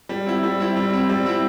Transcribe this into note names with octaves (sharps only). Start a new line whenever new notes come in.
G3
C4 E4
G3
C4 E4
G3
C4 E4
G3
C4 E4